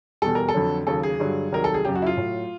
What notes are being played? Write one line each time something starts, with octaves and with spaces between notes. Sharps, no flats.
E2 B2 G3 A4
A#4
A4
F2 D3 F#3
D#2 C#3 F#3 A4
G#4
G2 D3 F#3
C2 C3 D#3 F#3 A#4
A4
G#4
F#2 C#3 F#3 G4
F#4
E4
F4
A2 F#3